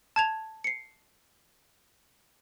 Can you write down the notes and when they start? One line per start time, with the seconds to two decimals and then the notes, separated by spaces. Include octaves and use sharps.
0.16 A5 G#6 F7
0.64 C7 C#7